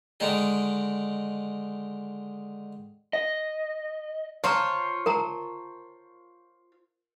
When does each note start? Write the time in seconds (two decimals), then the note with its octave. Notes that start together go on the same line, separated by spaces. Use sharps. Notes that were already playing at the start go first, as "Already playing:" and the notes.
0.20 D3 D#3 G#3 D#4 G#4
3.13 D#5
4.44 F4 C5 C#5 A5 A#5
5.06 A#4 A5 A#5